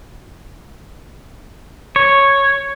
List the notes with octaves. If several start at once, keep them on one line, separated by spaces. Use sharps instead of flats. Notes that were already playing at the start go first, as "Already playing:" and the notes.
C#5